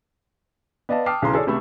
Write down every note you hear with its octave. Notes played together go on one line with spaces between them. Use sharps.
B3 D5 D#5 F5 A5
G5 A5 D6 D#6 F6 C7
B1 C#3 E3 A#5 C6
G#4 A4 C#5 D5
C#2 C3 A3 B5 E6